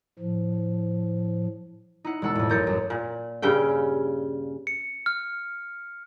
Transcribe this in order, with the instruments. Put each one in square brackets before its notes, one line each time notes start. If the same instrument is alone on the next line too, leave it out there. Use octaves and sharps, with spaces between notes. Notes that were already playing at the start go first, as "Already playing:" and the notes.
[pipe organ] A2 F3
[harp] D#4 E4 F#5
E1 G#3 F#5 A5 E6
F2 A2
A1 F#2 A#4 G6 A6 C#7
F#2 E7
[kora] A#2
G2 C#3 C#4 G5
[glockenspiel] C#7
F6